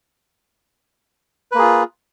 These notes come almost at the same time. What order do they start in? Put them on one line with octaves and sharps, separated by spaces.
B4 A#3 G#4 F4